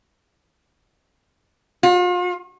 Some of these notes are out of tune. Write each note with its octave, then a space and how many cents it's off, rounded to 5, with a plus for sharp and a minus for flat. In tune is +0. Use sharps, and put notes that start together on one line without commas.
F4 +40